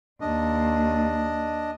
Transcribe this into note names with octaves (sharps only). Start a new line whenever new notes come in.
D#2 D4 D#5